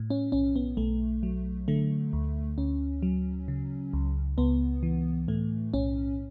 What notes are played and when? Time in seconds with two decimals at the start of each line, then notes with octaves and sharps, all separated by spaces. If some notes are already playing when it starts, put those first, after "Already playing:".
Already playing: A2
0.10 C#4
0.32 B1 C#4
0.56 B3
0.77 B1 A3
1.23 F#3
1.68 D3 A3
2.13 D2
2.58 D2 C#4
3.02 F#3
3.48 C#3
3.93 C#2
4.38 C#2 B3
4.83 E3
5.28 A2 A3
5.74 B1 C#4